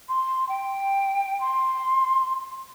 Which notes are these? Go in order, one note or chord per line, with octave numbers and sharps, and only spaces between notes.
C6
G5
C6